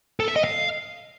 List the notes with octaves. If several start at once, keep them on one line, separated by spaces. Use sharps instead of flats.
A4
E5
D#5
F5